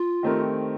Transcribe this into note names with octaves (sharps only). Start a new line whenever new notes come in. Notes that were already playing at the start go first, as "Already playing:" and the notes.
Already playing: F4
D#3 A3 C4 G4 A#4